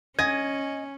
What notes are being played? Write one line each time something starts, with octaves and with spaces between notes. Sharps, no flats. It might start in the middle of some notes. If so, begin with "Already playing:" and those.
C#4 D#5 G#5 G#6